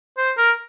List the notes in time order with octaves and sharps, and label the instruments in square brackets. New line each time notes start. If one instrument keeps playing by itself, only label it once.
[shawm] C5
A#4